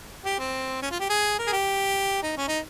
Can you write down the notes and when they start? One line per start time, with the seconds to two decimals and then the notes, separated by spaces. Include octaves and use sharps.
0.25 G4
0.39 C4
0.82 C#4
0.91 F4
1.00 G4
1.10 G#4
1.39 A#4
1.47 G#4
1.52 G4
2.23 D#4
2.37 C#4
2.48 D#4